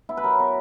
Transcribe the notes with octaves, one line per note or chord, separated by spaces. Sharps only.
B3 E4
B4
F#3 A#4
B3 A#4